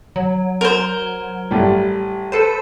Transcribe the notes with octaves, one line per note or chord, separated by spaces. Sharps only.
F#3
A#4 C5
A1 G3
A4 B4 C5